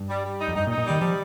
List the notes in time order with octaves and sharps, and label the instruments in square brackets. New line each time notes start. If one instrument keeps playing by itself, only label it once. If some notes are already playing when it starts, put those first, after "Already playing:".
Already playing: [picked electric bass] G2
[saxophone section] G3
G3
D#4
[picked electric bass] F2
[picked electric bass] G2 [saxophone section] D#4
[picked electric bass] A#2
[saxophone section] D#4
[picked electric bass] A#2
[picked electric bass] D#3 [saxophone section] G3
[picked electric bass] F3 [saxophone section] G3